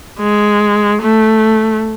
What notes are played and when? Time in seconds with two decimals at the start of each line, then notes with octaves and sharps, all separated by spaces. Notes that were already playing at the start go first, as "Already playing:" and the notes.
0.19 G#3
1.02 A3